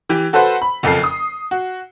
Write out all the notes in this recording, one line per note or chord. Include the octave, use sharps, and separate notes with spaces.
E3 G4
F#4 A4 B4 C5 F#5
B5
F#1 F2 A4 C7
D#6
F#4